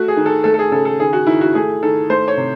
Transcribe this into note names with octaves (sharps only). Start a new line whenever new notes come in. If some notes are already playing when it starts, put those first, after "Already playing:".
Already playing: A3 F#4
G#4
D#3
A4
A3 A4
A4
G#4
C#3 A4
A4
D#3 G#4
F#4
D#3 E4
F#4
A3 G#4
D#3 A4
A3 C5
C#5
C3